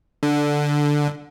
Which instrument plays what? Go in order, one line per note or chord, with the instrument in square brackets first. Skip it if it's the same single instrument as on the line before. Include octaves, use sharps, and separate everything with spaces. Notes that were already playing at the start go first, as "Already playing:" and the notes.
[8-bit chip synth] D3